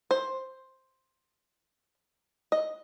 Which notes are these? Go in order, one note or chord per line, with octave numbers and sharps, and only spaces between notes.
C5
D#5